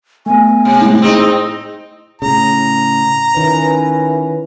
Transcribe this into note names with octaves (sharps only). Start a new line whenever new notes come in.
A3 B3 G#5
C3
A2 G#3
C4 D#4 G#4
A2 C#3 A#5
D#3 C#4 E4 B4